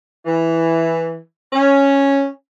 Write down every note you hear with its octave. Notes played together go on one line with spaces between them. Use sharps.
E3
C#4